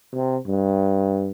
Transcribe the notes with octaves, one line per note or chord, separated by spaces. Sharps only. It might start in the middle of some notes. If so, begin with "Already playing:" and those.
C3
G2